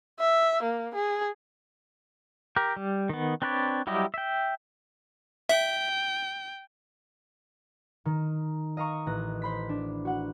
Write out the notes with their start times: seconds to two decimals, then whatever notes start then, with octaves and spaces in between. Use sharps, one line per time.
0.19 E5
0.63 A#3
0.95 G#4
2.56 G4 A#4
2.76 G3
3.09 D#3 B3
3.42 C4 D4 B4 C#5 D5
3.87 F#3 G3 E4 G4 D#5
4.14 E5 G5
5.49 E5 G5
8.05 D#3
8.77 D#5 F5 A#5 C#6
9.06 A1 F#6 A#6
9.42 C5 B5 B6
9.69 D4
10.05 F#4 F#5